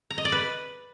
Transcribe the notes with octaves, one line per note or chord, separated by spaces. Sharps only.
A#5
D#5
D5
B4